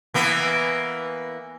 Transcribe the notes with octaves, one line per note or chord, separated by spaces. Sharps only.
E3 A#3 B3